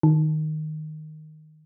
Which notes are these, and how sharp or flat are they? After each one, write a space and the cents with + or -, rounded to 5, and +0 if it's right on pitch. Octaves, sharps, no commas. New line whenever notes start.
D#3 -10